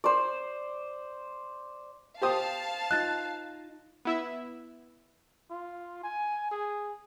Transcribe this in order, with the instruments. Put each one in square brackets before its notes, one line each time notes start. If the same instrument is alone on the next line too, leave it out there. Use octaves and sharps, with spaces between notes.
[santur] C5 D5
[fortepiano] G4 C5 D#6 [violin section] F5 A5
[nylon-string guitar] D#4 F4 D#5 [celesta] F#6 A6
[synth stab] B3 E4 E5
[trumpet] F4
G#5
G#4